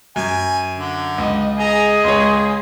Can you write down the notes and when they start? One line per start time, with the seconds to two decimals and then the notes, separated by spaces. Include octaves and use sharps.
0.16 F#2 G#5
0.78 D3
1.18 C#2 D#5
1.59 G#4 D#5 G#5 A#5
2.04 C#2 C#5 C6